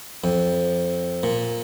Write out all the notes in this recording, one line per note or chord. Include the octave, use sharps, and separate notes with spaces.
F2
A#2